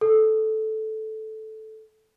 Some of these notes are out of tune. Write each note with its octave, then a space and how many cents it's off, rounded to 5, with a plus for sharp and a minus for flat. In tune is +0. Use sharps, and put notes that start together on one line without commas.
A4 -10